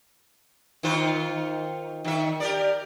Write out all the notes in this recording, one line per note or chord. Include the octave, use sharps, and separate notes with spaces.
D#3 F4 C5
D#3 E5
G4 A#4 D5